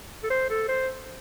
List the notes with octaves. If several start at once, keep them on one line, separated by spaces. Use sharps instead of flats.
A4
C5
A4
C5